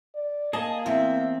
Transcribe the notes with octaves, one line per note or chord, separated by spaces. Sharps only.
D5
A#3 G#4 D#5 A5
E2 C4 E5